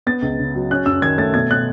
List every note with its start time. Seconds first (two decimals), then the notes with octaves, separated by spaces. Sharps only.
0.07 B3 A6
0.22 C#2
0.39 C#3
0.55 F#3
0.71 C#4 F#6
0.86 F#2 E6
1.02 D#3 G#6
1.18 A3 A6
1.34 B2 G#6
1.50 B2 F#6